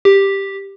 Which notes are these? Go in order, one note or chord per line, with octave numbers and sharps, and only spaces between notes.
G4